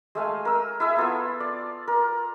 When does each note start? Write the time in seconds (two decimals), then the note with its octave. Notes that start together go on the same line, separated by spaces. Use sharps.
0.15 G#3 A3 F5 G#5
0.45 A#4 E6
0.80 E4 G#4 E5
0.96 B3 F4 A4
1.40 D5
1.88 A#4